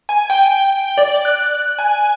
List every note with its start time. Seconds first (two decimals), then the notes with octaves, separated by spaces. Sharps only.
0.09 G#5
0.30 G5
0.98 D5
1.25 F#6
1.79 G#5